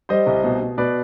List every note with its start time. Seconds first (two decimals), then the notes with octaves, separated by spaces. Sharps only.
0.09 G3 C5 D#5
0.26 C2
0.44 B2
0.61 B2
0.78 B2 B4 D5